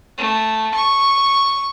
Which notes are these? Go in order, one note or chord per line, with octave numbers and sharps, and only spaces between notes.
A3
C#6